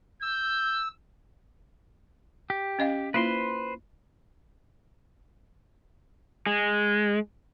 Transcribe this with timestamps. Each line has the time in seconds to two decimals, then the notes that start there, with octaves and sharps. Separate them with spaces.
0.22 E6 G6
2.50 G4
2.79 C#4 D#5 F5
3.14 A#3 E4 F4 B4 C5 C6
6.47 G#3